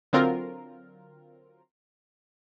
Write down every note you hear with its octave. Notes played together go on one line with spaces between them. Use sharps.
D3 F#3 C4 F4 A#4